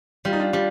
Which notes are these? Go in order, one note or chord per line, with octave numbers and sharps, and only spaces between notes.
G3 F4
D#4
D4 F4
G3 D4 F4